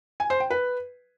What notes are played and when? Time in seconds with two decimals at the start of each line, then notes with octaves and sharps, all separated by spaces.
0.20 G#5
0.30 C5
0.40 G5
0.50 B4